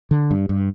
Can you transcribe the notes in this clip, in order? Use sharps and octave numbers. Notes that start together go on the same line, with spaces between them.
D3
G2
G2